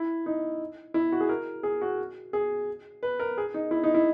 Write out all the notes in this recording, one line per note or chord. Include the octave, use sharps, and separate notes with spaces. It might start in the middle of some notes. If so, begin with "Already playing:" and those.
Already playing: E4
D#4
E4
F#4
G#4
A#4
G#4
F#4
G#4
B4
A#4
G#4
D#4
E4
D#4
E4